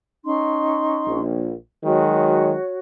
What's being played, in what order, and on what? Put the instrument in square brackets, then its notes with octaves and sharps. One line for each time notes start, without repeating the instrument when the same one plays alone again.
[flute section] C#4 D#4 C6
[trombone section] A#1
[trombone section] D#3 F#3 G#3 [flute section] F#4 C#5